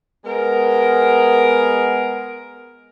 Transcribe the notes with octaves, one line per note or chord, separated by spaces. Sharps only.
G#3 B3 A#4